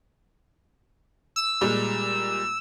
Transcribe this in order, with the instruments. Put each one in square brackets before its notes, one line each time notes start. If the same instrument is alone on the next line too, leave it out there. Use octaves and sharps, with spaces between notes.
[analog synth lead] E6
[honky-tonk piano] A#2 G3 G#3